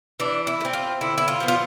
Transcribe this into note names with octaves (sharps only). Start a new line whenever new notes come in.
E3 D4
E4
A3
C4
F4
D3 E4
E4
F4
F3 B3
F4